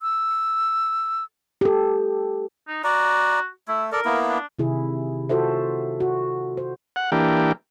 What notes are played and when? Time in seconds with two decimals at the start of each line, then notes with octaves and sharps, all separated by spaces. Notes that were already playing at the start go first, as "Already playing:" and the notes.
0.02 E6
1.61 G4 A4
2.68 D#4
2.84 F#4 D5 A#5
3.68 A3 E4
3.92 A4 A#4 D5
4.05 A#3 B3 E4
4.28 D4
4.59 C3 D#3 E4 G#4
5.29 F4 F#4 A4 C5 E5
6.00 F#4
6.57 C5
6.96 F#5
7.12 E3 A#3 D4 G4